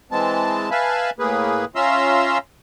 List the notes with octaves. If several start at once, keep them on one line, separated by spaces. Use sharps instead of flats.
E3 G#3 C4 A5
B4 E5 F5 G#5 A5 B5
A2 A#3 G#4 B4
C#4 F4 E5 A#5 C6 E6